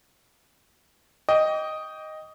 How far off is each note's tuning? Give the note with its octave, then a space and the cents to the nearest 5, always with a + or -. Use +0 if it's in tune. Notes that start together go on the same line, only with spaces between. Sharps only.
D#5 +0 G5 +0 D6 -40